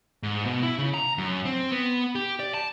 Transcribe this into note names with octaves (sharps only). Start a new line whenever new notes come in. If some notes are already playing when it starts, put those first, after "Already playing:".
G#2
B2
E4
C#3
A#5
F#2
C4
B3
G4
D5
A5